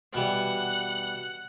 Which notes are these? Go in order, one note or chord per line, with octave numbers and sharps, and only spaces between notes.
B2 E3 G3 F#5